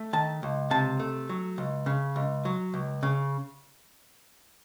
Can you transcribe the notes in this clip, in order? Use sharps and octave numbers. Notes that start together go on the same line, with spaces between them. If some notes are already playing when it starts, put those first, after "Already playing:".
Already playing: A3
D#3 A5
C#2
C3 A5
A3
F#3
C#2
C#3
C#2
F#3
C#2
C#3